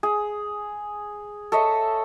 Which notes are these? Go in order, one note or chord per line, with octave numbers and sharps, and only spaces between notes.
G#4
A4 C#5 D#5 E5